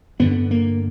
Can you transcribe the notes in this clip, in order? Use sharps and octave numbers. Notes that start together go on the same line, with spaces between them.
G2 D3 B3
A#3